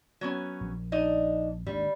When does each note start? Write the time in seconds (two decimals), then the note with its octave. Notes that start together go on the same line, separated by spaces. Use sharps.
0.21 F#3 B3 C#4
0.61 A#1
0.92 D4 D#4 D#5
1.67 G#1 D#2 G3 D4